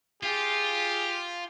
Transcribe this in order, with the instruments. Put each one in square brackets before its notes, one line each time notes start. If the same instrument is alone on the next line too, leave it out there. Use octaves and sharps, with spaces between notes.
[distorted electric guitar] F4 [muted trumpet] G4 [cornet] G#4